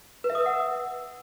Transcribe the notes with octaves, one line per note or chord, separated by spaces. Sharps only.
B4
E5
D#6
E6
F#5